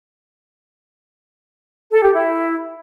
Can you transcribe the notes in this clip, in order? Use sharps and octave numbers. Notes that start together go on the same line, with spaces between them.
A4
G4
E4